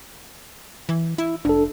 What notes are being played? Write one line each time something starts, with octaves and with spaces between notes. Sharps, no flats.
E3
E4
F1 D4 A4